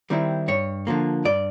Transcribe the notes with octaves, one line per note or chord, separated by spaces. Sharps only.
D#3 G3 C4 E4
G2 C#5
D3 F3 A#3
G2 D5